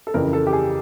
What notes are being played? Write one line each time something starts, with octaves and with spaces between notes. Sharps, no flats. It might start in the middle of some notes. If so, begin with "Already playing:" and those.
A4
F2 C#3 E3 A#4
A#4
A4
G4
G#4